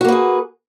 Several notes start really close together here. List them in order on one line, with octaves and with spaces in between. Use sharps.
F#4 A#3 B4 G#4